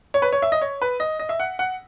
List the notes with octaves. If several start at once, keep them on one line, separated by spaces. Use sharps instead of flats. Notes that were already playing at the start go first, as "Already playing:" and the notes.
C#5
B4
C#5
E5
D#5
C#5
B4
D#5
D#5
E5
F#5
F#5